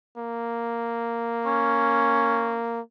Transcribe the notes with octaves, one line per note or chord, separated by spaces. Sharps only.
A#3
C#4